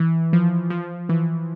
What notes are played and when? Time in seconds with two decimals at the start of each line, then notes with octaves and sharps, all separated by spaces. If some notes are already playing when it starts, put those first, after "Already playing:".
Already playing: E3
0.33 F3
0.70 F3
1.09 E3